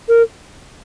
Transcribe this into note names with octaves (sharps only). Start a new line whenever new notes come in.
A#4